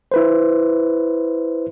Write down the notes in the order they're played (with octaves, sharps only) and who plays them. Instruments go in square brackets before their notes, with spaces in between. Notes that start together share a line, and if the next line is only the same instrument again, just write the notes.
[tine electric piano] E4 B4 C5